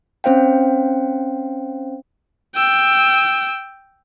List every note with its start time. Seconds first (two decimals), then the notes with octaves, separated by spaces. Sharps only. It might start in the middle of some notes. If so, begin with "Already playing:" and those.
0.24 C4 C#4 C5 F5 G5
2.55 G5 E6